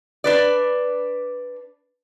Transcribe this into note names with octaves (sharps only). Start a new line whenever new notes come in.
D4 B4 D5